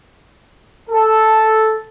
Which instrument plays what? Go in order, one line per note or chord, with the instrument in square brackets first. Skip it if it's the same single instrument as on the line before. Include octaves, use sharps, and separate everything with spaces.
[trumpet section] A4